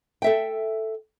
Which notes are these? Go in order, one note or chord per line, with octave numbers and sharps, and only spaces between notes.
A4 E5 G5